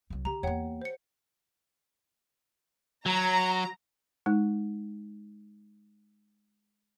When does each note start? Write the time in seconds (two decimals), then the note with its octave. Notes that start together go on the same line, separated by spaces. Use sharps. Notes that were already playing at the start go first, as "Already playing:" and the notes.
0.10 C2 F#3
0.25 D3 G4 A#5
0.43 E2 A#3 C#5 F#5 G5
0.82 C5 C#7
3.06 F#3 A#5
4.26 G#3 D#4